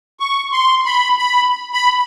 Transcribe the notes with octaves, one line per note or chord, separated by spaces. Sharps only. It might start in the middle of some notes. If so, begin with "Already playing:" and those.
C#6
C6
B5
B5
B5